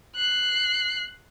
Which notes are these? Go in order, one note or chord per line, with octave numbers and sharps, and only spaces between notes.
F#6 C7